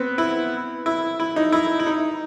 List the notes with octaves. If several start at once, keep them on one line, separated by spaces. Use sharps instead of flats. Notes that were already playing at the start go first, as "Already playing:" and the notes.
Already playing: B3 C4
E4
E4
E4
D#4
E4
E4
D#4